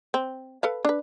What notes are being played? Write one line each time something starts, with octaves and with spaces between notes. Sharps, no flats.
C4
A4 B4 F5
D4 B4